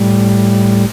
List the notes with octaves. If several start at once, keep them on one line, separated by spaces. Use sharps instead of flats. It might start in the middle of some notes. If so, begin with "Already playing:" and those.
Already playing: A2 G3